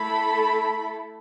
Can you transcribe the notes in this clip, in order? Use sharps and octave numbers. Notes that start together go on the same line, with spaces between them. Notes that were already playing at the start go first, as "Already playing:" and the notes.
Already playing: A3 E4 A4 B5